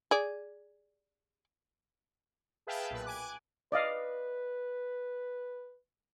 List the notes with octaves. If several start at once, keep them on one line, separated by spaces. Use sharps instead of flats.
G#4 D5
G#4 B4 E5 F5 G5 A5
B1 A#2 B4
G#5 D6 F#6
B4 D5 D#5 F5